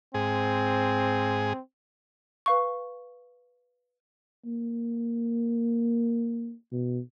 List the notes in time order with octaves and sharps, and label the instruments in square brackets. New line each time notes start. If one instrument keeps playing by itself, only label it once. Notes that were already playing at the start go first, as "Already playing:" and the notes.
[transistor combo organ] G#2 G#4 [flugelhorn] C4
[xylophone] B4 F5 C#6
[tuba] A#3
B2